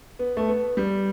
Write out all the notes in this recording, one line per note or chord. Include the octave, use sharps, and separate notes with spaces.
B3
A3
B3
G3